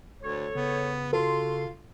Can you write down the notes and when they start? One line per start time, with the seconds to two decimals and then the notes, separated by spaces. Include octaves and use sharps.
0.22 D2 A4 C#5
0.55 C#3 B3
1.13 F4 F#4 A4 C6